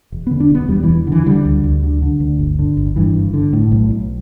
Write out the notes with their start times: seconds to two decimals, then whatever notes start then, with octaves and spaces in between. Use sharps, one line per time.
0.12 E1
0.27 D3 B3
0.40 D4
0.50 E1 B3
0.69 E2 G3
0.84 E1 E3
1.07 D3 E3
1.26 D3 G3
1.45 D2
1.64 D2
1.83 D3
2.02 D3
2.20 D2
2.39 G1
2.59 D3
2.77 G1
2.96 G2 E3
3.15 G1
3.34 D3
3.53 A2
3.72 B1
3.91 B1